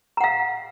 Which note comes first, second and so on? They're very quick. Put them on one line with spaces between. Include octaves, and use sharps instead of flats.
A#5 F#5 F5